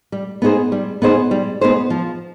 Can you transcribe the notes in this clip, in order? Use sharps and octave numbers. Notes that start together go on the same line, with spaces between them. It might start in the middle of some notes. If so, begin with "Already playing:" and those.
G3
B3 D#4 G#4 C5
G3
B3 D#4 G#4 C5
G3
B3 D#4 G#4 C5
F3